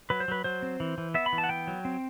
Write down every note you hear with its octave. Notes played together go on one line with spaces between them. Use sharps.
F#3 B4
C5
F#3 B4
F#3 C5
C4
E3
E3
B3 E5
B5
E3
A5
F#5
B3 G5
F#3
C4